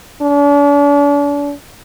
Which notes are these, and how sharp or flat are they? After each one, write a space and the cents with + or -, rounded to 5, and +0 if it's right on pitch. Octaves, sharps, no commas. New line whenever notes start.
D4 -40